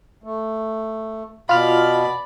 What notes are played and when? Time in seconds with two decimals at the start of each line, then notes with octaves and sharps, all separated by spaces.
0.24 A3
1.49 B2 F4 D5 B5 F6